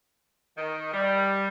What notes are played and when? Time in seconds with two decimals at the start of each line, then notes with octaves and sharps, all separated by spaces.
0.57 D#3
0.92 G3